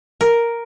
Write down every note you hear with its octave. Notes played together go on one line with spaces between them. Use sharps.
A#4